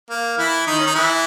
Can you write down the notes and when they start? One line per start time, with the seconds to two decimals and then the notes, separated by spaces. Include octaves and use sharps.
0.10 A#3
0.38 E3 E4
0.67 D#3 D#4
0.79 C#4
0.87 D#4
0.95 E3 E4